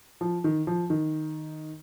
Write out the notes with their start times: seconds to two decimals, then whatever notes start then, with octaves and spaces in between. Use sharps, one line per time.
0.21 F3
0.44 D#3
0.67 F3
0.90 D#3